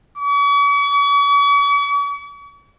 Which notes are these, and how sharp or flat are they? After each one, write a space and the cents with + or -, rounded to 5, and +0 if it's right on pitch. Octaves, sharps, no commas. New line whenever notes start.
C#6 +45